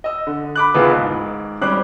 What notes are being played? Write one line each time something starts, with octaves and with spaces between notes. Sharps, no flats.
D#5 E6
D3
B5 D6 F#6
F#1 D#2 B3 E4 F4 B4
G#2
G#1 G3 C#4 C5 D6 F#6